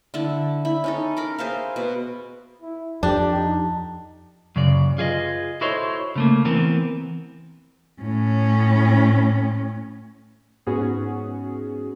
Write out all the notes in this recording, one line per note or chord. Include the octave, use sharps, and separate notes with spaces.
D3 E4 A5
E4
C#4 D#4 A4
A#4 B5 D6
G#4 C5 E5 F5
B2
E4
F2 D4 G4
D#4
F#2 C#3 D5
F4 G#4 B4 D5 D#5
E4 F#4 A4 C5 C#5 D#5
C#3 A3 A#3
E3 B3 C4 A#4
A2 C#4
G#2 B3 C#4 F#4 G#4